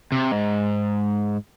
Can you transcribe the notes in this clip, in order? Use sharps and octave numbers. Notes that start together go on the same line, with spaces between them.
C3
G#2